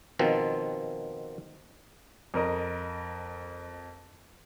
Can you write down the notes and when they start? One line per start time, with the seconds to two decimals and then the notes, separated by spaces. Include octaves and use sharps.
0.19 B2 D#3 F3 C4
2.34 F2 A#4 D#5